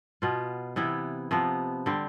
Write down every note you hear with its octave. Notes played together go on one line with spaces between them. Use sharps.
B2 B3 F4
C3 E3 B3 E4
C3 F3 B3
D3 G3 C4